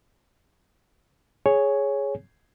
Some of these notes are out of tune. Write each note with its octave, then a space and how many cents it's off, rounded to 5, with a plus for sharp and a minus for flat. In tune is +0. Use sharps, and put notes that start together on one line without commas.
G#4 +0 C#5 +0 G#5 +0